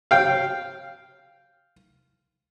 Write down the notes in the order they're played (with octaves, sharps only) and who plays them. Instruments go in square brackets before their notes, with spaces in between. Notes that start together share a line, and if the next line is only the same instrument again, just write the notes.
[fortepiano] F5 G5